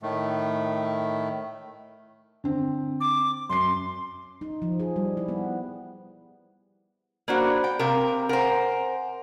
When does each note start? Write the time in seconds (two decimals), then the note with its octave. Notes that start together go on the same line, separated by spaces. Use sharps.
0.02 A2 D#3 A3
2.44 D3 C4
3.01 D6
3.49 F#2 C6 C7
4.41 D#4
4.62 F3
4.80 G#4
4.96 G3
5.17 E4
5.28 B3
7.28 A#3 D4 F#4 C5 F#5 B5
7.64 G5
7.79 C3 C4 A#4 F5 D6
8.29 A#4 C5 F#5 G#5